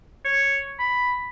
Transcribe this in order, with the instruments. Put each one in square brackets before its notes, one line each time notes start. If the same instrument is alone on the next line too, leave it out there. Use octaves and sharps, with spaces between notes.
[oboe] C#5
B5